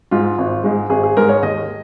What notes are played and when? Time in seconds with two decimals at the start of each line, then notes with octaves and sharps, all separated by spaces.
0.11 G#2 G#3 F4
0.38 G#1
0.64 G#2 G#3
0.90 G#1 G#4
1.03 G#4
1.17 G#2 G#3 A#4
1.29 C#5
1.43 D#2 D#5